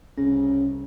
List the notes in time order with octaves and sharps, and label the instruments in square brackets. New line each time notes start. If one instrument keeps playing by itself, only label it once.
[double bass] C2 [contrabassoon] C#3 [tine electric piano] C#4